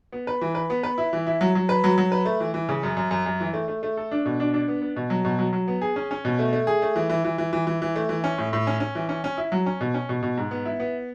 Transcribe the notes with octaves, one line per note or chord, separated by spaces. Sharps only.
B3
B4
E3
B4
B3
B4
E4
E3
E4
F#3
F#3
B4
F#3
F#3
B4
A3
E3
E3
C#3
F#2
F#2
F#2
F#2
E3
A3
A3
A3
A4
D4
B2
D4
D4
B3
B3
B2
F#3
B2
F#3
F#3
B3
G#4
C#4
C#4
B2
A3
A3
G#4
A3
E3
E3
E3
E3
E3
E3
E3
A3
E3
C#4
A2
A2
C#4
C#4
E3
C#4
C#4
E4
F#3
C#4
B2
C#4
B2
B2
G#2
B3
E4
B3